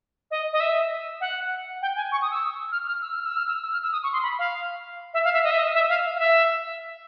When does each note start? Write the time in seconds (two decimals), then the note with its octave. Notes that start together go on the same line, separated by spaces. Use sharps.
0.31 D#5
0.53 D#5
0.60 E5
1.21 F#5
1.82 G5
1.96 G#5
2.12 C#6
2.22 D#6
2.31 E6
2.72 F6
2.87 F6
3.02 E6
3.13 F6
3.25 E6
3.37 F6
3.48 E6
3.62 E6
3.73 F6
3.83 E6
3.92 D#6
4.03 C#6
4.13 C6
4.23 B5
4.39 F5
5.14 E5
5.24 F5
5.33 E5
5.44 D#5
5.51 E5
5.58 D#5
5.74 E5
5.89 F5
6.15 F5
6.19 E5